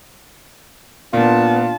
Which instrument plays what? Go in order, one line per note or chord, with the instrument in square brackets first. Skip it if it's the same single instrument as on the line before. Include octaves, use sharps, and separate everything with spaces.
[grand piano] A#2 [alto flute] B3 [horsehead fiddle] D4 A5 [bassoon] F4